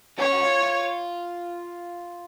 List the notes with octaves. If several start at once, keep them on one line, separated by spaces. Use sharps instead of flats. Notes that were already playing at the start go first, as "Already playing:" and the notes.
C#4 C#5
F#4
F4
F4